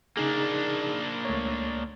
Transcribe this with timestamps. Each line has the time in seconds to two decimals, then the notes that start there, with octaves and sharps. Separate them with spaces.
0.17 C#3 A#3 D4 D#4 G#4
1.25 C#2 A3 C#5